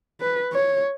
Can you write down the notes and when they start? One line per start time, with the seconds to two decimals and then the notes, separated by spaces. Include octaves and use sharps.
0.21 B4
0.52 C#5